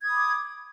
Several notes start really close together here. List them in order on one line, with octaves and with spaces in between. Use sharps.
G#6 D#6 B5 D6